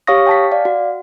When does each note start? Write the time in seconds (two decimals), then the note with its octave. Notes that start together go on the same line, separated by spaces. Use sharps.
0.07 G4 C#5 F5 C#6 D#6 A#6
0.27 G5 A5 B6
0.52 D5 F5
0.65 F#4